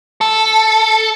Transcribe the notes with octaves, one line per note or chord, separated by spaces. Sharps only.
A4